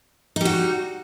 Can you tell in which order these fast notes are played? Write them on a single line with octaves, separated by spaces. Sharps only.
D#4 G3 F#4